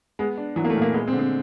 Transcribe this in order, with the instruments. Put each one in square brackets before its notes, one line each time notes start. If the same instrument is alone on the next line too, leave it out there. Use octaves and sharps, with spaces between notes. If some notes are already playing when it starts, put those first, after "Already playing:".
[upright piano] G#3 [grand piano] B3
[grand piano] D4
[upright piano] E3 [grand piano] F#3
[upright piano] A#3
A3
[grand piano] A#2
[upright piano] A#3
[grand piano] G#3 [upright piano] B3
[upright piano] C4
[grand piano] D3
[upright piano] C4